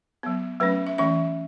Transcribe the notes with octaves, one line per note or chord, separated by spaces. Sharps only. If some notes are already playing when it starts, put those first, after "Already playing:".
F#3 B3
F#3 A3 C#4 B4
E5
E3 A3 C#4 E5